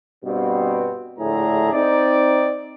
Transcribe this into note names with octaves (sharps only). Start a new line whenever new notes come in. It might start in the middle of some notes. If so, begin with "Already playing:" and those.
G2 B2 B3 C4
A#1 A2 D3 A3 G#4 A#5
C4 D#4 D5